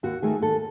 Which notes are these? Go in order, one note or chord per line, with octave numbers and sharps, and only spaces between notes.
D#2 F#4
D#3 A3 G#4
D#2 A4